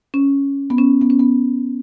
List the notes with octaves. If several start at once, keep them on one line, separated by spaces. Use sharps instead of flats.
C#4
B3
C#4
B3
C#4
B3